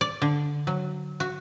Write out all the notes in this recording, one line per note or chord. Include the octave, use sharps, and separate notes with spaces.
D5
D3
F#3
F#4